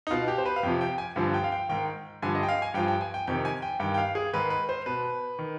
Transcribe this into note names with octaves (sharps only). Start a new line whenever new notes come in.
D#4
B2 F4
G4
C5
B4
F5
F2 C3 F3 G5
G5
G#5
G2 D3 F3
G5
F5
G5
G#2 D#3 G5
G2 D3 F3 G#5
D#5
G5
F5
G#5
G2 F3 G5
G5
G#5
G5
F2 C3 D#3 G5
G#5
G5
G2 D#3 G5
G5
F5
G#4
G#2 D#3 B4
B4
C5
B2 B4
D#3